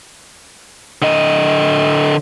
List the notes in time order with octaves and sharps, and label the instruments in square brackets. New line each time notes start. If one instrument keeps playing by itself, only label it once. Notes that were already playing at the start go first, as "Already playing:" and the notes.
[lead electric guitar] D3 D#5